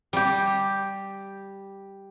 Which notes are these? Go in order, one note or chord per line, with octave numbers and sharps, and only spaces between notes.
G3 G4